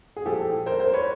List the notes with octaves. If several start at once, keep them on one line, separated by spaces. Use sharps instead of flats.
G#4
A#2 F3 G4 A4
A#4 C5
A#4 C5
B4 C#5